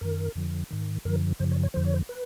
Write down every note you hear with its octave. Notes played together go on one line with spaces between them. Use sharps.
F#2 D#3 A#4
F2 D3 F3
G#2 D#3
F#2 D3 F3 A#4
F#2 C#3 F3 C5
C#5
C#5
F2 D3 F3 C5
C#5
C5
B4